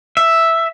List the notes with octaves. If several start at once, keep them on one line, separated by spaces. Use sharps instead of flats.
E5